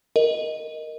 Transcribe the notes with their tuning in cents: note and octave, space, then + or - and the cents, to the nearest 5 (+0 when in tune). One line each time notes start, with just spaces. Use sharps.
A#4 +0 D#5 +0